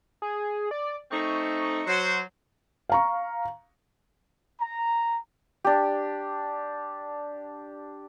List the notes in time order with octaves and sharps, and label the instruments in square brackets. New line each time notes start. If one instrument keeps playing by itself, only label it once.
[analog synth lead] G#4
D5
[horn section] A3 C4 D#4 [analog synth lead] C#6
[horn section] F#3 [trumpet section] F#4 C5
[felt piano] F5 A#5 C#6
[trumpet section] A#5
[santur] D4 G4